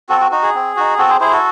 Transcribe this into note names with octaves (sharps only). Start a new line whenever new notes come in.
C4 F#4 A4
F#4
D#4 F#4
G#4
C4
D#4 F#4
C4 F#4 A4
G#4 C5
E4 G#4 C5
F#4 A4